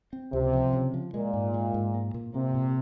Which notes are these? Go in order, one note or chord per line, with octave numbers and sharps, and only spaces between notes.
C4
C#2 C3
F3
C#3
F3
A#2 G#3
G#2
G#3
G#2
A#3
A#2
C3 A#3
A#2